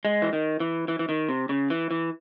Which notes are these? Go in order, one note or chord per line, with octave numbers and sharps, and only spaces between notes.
G#3
E3
D#3
E3
E3
E3
D#3
C3
C#3
E3
E3